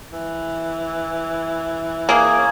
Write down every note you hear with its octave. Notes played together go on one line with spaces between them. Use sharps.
E3
A#3 G#4
C#4